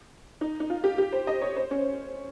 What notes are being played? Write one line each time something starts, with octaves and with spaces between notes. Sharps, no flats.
D#4
D#4
F4
G4
G4
C5
D#5
C#5
C5
C#4